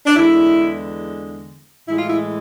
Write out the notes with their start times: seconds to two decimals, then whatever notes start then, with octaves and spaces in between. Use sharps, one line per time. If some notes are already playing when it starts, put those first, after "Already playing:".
0.06 D4
0.17 E2 D3 G#3 E4
1.88 A2 E3 G#3 E4
1.99 F4
2.10 E4